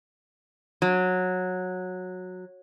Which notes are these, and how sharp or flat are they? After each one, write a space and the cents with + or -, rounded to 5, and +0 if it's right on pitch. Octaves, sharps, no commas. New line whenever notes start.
F#3 -15